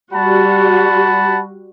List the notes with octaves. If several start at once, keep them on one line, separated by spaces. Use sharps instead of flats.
G3 F#4 F#5 A5 B5